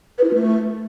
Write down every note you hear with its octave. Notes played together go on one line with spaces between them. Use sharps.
B4
E4
F4
A3